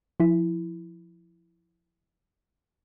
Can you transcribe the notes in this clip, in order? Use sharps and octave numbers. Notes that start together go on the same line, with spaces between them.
F3 E4